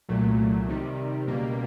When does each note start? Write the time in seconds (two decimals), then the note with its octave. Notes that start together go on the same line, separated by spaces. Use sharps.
0.09 C2 A#2 F#3 A3
0.68 C3 D#3 G3
1.28 C#2 B2 G3 A#3